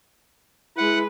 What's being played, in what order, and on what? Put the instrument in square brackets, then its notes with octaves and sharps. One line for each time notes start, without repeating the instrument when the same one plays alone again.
[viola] G#3 B4 [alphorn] E4 [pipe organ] F#5